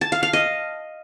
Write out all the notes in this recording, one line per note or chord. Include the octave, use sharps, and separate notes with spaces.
A5
F5
F5
D#5